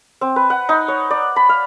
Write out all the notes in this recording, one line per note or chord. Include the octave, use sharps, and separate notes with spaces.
C4
B4
F#5
D#4
C#5
D5
B5
F5